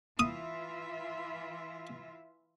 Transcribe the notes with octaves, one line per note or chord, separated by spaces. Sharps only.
E3 F4 E5 D#6